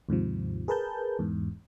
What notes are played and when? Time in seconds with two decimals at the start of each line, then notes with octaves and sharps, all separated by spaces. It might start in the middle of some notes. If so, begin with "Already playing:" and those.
0.09 D#2 G#2 C3 F3
0.68 G#4 A#4 B4 A5 G6
1.19 E2 G#2